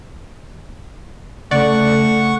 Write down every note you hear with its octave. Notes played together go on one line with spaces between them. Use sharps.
C#3 A3 D5 F#5 C#6